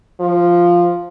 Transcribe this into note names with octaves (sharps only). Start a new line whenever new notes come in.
F3